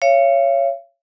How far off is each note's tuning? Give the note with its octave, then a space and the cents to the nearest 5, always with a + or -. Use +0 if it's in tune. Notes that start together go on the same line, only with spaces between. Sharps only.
C#5 +0 F5 -40